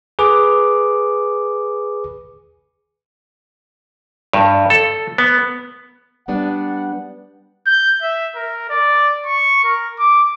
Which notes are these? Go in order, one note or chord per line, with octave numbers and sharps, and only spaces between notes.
G#4 B4 D6
G2
A4
B3
G3 B3 D4 F#5
G6
E5
A#4
D5
C#6
A#4
D6